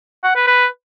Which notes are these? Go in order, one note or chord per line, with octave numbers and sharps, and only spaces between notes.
F#5
B4
B4